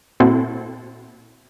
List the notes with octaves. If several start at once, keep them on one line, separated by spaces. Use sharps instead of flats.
A#2 C4 E4 F#4 A4